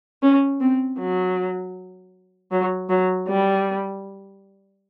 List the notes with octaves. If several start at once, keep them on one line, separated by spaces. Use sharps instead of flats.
C#4
C4
F#3
F#3
F#3
G3